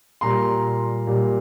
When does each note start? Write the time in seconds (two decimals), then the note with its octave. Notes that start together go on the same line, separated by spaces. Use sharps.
0.21 A#2 G3 A#5 C6
1.07 A#2 G3